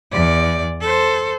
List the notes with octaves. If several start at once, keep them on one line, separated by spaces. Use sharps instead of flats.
E2 D5
A4 C5